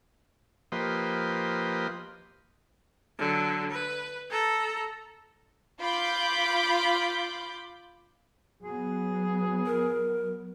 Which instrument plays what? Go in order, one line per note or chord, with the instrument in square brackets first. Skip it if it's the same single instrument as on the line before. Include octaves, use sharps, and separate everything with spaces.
[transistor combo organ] F3 A#3 G4 B4 C5 D#5
[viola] D3 F#3
B4
A4 A#5
[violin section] F4 B5 D6 G6
[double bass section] F#3 B3 [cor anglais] G#4
[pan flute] A#4